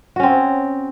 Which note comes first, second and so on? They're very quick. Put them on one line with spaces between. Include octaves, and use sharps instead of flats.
F#4 C#4 C4